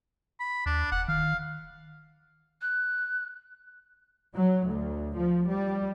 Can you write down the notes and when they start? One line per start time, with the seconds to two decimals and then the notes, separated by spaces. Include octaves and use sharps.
0.40 B5
0.66 D#2 D4
0.92 E1 F#5
1.08 D#3 F5
2.62 F#6
4.35 F#3
4.68 D2
5.16 F3
5.48 G3